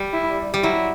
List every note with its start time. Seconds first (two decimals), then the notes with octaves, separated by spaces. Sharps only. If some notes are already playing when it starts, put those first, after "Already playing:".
Already playing: G3
0.13 E4
0.54 G3
0.63 F#3 E4